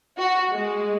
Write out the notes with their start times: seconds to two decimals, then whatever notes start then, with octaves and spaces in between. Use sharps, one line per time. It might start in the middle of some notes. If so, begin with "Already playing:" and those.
0.19 F#4
0.51 G#3